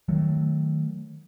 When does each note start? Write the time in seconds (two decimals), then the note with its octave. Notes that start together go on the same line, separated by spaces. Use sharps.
0.08 D#3 F#3 A3